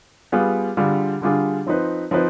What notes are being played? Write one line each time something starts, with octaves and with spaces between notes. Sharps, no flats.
G3 B3 F4 G#4
D3 G3 D4 F4 G#4
D3 G3 D4 F4 G#4
F3 C4 D#4 B4
F3 C4 D#4 B4